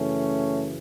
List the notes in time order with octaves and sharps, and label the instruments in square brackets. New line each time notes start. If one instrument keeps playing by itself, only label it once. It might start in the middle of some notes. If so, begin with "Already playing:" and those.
Already playing: [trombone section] F#2 C#3 E3 A3 C#4